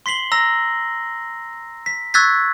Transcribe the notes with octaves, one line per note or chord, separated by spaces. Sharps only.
C6 B6 C7 F#7 G7
A#5 E6 A#6
B6
C#6 E6 F#6 G#6 A6 B6